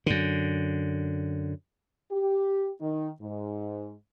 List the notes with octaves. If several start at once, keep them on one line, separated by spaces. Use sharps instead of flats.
F#2 D3
G4
D#3
G#2